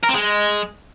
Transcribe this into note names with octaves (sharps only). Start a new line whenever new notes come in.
A#4
C4
G#3